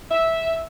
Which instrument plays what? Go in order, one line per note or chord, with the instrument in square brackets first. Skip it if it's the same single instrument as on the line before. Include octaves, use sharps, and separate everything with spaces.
[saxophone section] E5